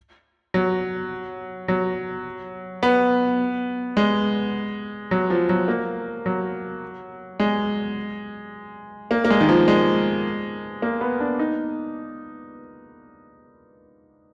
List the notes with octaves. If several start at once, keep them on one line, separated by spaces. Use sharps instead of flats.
F#3
F#3
B3
G#3
F#3
F3
F#3
A#3
F#3
G#3
A#3
A#3
G#3
D#3
F3
G#3
A#3
B3
D4
D#4